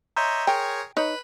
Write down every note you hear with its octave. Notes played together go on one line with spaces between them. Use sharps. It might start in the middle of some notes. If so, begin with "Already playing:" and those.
C#5 D#5 E5 A#5 C6 G6
G#4 A#4 C#5 G5
D#4 B4 C#5 B5